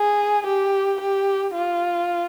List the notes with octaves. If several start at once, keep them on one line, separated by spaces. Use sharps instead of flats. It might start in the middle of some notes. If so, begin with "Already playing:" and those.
Already playing: G#4
G4
G4
F4